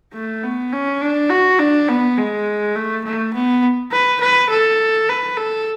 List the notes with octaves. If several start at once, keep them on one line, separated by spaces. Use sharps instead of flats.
A3
B3
C#4
D4
F#4
D4
B3
G#3
A3
A3
B3
B4
B4
A4
B4
A4